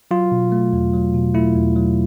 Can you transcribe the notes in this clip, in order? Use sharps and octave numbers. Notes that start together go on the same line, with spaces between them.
F#3 F4
B2
A3
E2
F#3
B2
A3 E4
E2
F#3